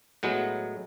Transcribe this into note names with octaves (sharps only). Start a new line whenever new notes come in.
A2 F#3 G#3 B3